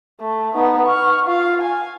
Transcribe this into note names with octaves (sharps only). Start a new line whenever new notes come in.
A3
B3 D#4
C#6 F6
F4 F5
G#5